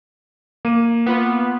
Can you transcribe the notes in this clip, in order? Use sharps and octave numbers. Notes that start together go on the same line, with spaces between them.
A#3 D#7
B3 F4 B4